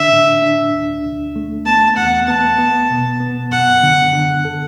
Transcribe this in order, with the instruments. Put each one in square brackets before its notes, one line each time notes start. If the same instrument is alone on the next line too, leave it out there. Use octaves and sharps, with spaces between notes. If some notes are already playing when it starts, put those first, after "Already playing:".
Already playing: [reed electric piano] D3 D4 [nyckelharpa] E5
[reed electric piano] A2
D4
D2
D2
A3
[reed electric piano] B3 [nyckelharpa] A5
[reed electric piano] E2 [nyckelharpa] F#5
[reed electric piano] B3 [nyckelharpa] A5
[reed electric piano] B3
B2
B3
[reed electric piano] F#2 [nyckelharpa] F#5
[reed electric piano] D3
D3
A4